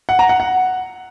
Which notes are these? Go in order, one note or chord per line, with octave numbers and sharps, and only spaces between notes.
F#5
A#5
F#5
F#5